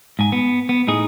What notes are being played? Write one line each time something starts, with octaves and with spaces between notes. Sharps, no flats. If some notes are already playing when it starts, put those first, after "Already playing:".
G#2 G#5
B3
B3
A2 D#4 G#4